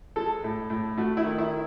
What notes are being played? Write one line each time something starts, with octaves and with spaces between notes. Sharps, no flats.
G#3 A4
A2
A2
A3 F#4
E4
D#3
E4